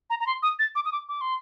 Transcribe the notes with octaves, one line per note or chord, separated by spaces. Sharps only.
A#5
A#5
C6
D#6
A6
D6
D#6
D6
D6
C6